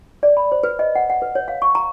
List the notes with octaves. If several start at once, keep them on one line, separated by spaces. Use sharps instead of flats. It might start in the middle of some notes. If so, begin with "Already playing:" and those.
D5
B5
C5
B4
D#5
F#5
F#5
B4
C#5
F5
C#6
A#5